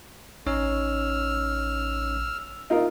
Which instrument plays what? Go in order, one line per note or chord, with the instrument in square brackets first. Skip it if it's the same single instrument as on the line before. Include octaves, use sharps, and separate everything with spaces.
[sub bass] A1 [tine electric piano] C#4 D#4 C#5 [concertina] E6 F6
[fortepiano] D#4 F4 A#4